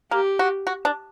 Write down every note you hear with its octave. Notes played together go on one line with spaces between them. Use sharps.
A#3 G4
F#4
F#4
D4